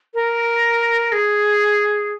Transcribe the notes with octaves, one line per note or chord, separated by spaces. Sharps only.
A#4
G#4